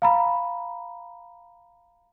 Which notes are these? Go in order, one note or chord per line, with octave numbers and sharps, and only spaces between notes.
F5 A#5 B5